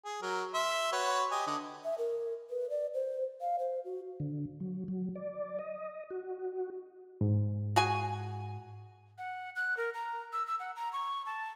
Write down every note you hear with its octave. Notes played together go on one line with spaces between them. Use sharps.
G#4
F#3 A#4
E5 C6
F#4 B4 C#5
G4 D#5 G#5
D3 D#5
E5
A#4
B4
D5
C5
F5
C5
F#4
D3
F#3
F#3
D5
D#5
F#4
G#2
F#4 G#4 G#5
F#5
F#6
A#4
A#5
E6
E6
F#5
A#5
C#6
A5